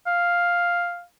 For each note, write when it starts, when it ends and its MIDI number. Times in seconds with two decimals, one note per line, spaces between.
0.06 1.03 77